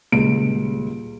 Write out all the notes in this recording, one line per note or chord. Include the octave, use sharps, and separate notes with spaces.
D#1 C#2 D7